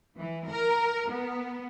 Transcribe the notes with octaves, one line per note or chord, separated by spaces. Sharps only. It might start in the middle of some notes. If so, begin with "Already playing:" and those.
E3
A#4
B3